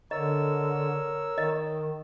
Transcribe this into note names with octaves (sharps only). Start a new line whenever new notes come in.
D3 A#4 C#5 D#5 E6
D#3 D#5